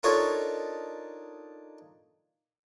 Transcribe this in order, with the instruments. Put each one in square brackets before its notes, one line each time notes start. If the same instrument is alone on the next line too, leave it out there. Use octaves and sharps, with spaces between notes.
[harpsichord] D4 D#4 F4 A4 A#4 C#5